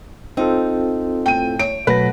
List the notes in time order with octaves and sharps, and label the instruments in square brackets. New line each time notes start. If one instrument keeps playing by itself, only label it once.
[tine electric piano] C4 F4 A4 [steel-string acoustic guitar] D#4
[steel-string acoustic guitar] A2 [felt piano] G5 D#7
[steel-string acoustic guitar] C#5 [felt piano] D7
[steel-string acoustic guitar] F#2 A3 F#5 [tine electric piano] B2 F#3 A#6 [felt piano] B4